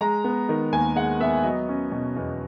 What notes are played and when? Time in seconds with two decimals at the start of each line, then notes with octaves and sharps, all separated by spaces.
0.01 G#3 A#5
0.24 B3
0.49 D#3
0.73 D#2 G#5
0.96 G#3 F#5
1.20 B3 E5
1.44 F#3 D#5
1.69 C#4
1.92 B2
2.16 E2